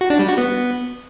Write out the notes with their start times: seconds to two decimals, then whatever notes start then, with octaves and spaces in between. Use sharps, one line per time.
0.01 F#4
0.10 D4
0.19 G3
0.28 F#4
0.38 B3